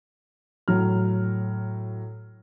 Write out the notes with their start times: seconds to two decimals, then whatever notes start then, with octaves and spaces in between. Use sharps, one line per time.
0.68 A2 F#3 F6